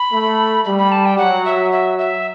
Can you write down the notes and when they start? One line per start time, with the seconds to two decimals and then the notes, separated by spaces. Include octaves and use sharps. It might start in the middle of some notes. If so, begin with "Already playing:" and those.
Already playing: B5
0.11 A3
0.65 G3 B5
0.79 B5
0.92 A5
1.06 G5
1.18 F#3 F#5
1.45 E5
1.72 E5
1.99 E5